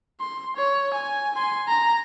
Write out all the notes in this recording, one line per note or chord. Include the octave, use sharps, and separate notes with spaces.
C6
C#5
G#5
G#5 C6
A#5